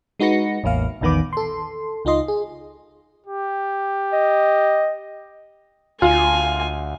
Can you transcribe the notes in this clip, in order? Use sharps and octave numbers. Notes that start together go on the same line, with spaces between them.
G#3 D#4 F#4 B4 A#6 C#7
A1 E2 A#3 F5
A#1 E2 D#3 B3 B4 D6
A4 C6
C#2 D#4 F4 D#5 C6
G#4
G4
D#5
D2 F4 G#5